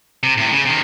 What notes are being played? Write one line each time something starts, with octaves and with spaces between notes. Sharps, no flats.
C3
A2 C3
C#3
C3 D#3